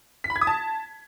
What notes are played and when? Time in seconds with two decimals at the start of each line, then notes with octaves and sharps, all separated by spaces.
0.24 B6
0.30 B5
0.36 G#6
0.41 D#6
0.47 A5